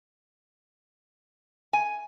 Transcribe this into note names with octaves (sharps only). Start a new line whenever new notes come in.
G#5